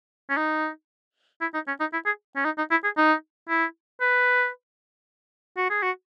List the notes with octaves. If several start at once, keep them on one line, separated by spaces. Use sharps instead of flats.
C#4
D#4
E4
D#4
C#4
D#4
E4
G#4
C#4
D#4
D#4
E4
G#4
D#4
E4
B4
F#4
G#4
F#4